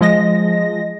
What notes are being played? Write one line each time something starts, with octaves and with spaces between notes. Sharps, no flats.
F3 G#3 D#5 A#6